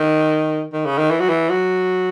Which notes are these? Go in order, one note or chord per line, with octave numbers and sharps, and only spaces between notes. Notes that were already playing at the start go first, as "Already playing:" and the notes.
Already playing: D#3
D#3
C#3
D#3
E3
F#3
E3
F#3